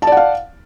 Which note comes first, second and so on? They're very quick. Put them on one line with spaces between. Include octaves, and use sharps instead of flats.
A5 D5 F#5 F5